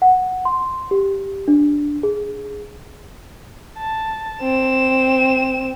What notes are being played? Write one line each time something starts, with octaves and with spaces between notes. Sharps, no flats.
F#5
C6
G4
D4
G#4
A5
C4 E7